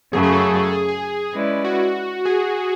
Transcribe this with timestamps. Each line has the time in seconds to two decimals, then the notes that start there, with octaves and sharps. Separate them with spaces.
0.12 F#2 C#3 F#3 A3 G#4
0.23 G#4
0.33 A4
0.73 G#4
0.88 G#4
1.34 G#3 C#4 E4 B4 D5
1.64 F#4
2.25 G#4